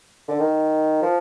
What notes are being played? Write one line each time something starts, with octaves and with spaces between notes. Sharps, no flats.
D3
D#3
F3